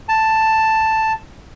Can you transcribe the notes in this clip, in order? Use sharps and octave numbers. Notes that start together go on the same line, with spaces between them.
A5